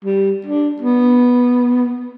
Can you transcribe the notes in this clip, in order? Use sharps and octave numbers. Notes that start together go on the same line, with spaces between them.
G3
D4
B3